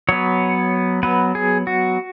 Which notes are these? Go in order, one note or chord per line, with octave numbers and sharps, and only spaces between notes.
F#3 B3 C#5
F#3 B3 B4
G#4
F#4